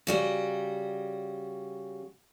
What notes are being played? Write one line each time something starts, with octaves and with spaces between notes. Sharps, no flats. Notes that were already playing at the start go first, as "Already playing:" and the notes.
C#3 G3 F#4